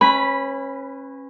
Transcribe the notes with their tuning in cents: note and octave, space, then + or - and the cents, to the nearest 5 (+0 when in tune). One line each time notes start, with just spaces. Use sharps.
C#4 -25 B4 +15 B5 -10